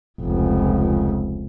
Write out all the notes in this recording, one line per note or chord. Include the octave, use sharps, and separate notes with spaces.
F1 C#2